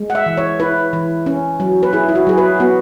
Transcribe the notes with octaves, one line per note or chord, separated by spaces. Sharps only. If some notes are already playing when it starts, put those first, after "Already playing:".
Already playing: G#3
F#5
E5
E3
C#5
E4 B4
E3
C#4
F#3
B4
E4 G#4
E4
F#4
F#3 G#4
B4
B3 F#4